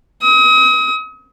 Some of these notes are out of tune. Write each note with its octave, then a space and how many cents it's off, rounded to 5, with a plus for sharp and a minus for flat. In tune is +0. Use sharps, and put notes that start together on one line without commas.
D#6 +40